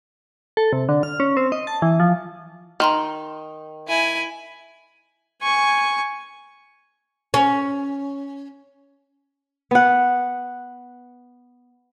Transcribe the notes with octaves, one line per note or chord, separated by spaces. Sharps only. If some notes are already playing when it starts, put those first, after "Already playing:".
A4
C3
D3
F6
C#4
C4
D#5
A5
E3
F3
D#3 A#5 C6 F6
E4 G#5
G#5 C#6
C#4
B3 F#5